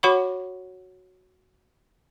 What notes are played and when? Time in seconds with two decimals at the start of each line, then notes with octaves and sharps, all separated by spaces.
0.03 F#4 C#5 F#5 B5 C#6